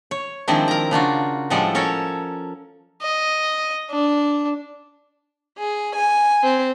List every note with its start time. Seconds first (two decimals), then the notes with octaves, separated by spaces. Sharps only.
0.11 C#5
0.48 D#3 F3 G#3 C4 D4 E4
0.68 A#4 A#5
0.91 C#3 D4 F4 F#4
1.50 A2 F3 G3 G#3 A4 F#5
1.75 C#4 A4 A#4 C#5
3.02 D#5
3.90 D4
5.58 G#4
5.96 G#5
6.43 C4